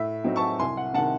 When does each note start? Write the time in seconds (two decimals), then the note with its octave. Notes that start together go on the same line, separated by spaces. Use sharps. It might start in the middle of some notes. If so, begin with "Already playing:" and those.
Already playing: A2 E5
0.24 F#3 C4 D#4
0.36 A5 C#6
0.59 C2 G#5 C6
0.77 F#5
0.94 C3 D#3 F#5 A5